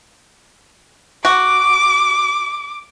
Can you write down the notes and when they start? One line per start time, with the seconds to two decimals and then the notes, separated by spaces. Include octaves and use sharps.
1.25 F#4 D6